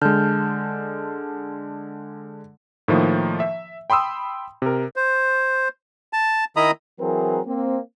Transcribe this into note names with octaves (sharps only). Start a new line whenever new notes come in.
D3 G#3 A5 F6 G6
A2 D#3 F3 A#3
E5
G5 B5 C6 D#6 E6
C3 A#4
C5
A5
D#3 E4 D#5 A#5 B5 D#6
E3 F#3 C4 G#4 A#4
A#3 C4